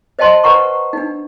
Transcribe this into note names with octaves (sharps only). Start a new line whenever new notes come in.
C5 D#5 G5 A5 C6
B4 C5 F#5 A#5 C#6
D4 D#4